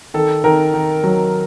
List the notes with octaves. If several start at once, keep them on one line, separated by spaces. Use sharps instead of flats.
D#3 A4
D#3 A#4
D#3
F#3